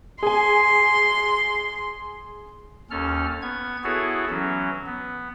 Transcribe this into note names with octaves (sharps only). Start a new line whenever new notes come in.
G#4 G#5 C6
D#2 C#4 A4 F6
B3 G#6
B3 E4 F#4 G#4 A4 C#5
E3 F#3 C#4
B3